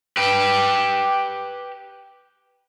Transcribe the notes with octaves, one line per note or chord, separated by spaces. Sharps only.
G4 B4